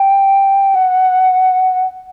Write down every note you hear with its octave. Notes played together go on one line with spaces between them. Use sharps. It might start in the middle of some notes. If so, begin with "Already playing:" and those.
Already playing: G5
F#5